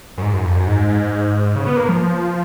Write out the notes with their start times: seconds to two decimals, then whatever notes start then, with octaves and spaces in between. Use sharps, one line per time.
0.18 F#2
0.22 G#2
0.33 F#2
0.45 F2
0.56 F#2
0.67 G#2
0.89 G#2
1.56 C#3
1.67 B3
1.77 A#3
1.89 F3